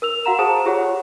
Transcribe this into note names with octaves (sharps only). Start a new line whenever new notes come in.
A#4 E6 F7
F#4 F5 F#5 A#5 E7
G#4 C5 A5 D#6 E7
F4 G4 G#4 C#5 F#5